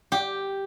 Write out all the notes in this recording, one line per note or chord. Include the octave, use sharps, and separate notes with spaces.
G4